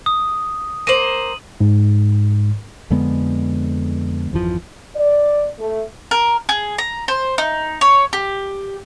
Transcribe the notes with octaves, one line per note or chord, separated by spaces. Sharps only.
D#6
A#3 C5 D#7 F#7
G#2
F2 D3 G#3 B3
G#1 F2 E3 F3
D5
A3
A#4
G#4
A#5
C5
D#4
C#5
G4